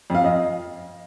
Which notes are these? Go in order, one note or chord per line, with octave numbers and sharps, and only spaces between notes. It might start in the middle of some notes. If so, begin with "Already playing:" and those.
F2 F5
F2 D#5